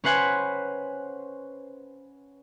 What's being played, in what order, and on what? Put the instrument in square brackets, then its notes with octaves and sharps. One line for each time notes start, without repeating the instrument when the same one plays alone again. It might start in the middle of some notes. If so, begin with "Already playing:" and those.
[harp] C#4 B4 C5 F#5 G#5